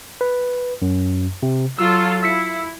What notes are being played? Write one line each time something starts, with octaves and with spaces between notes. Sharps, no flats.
B4
F#2
C3
F#3 F4 A4 E6
E4 E6 B6 C#7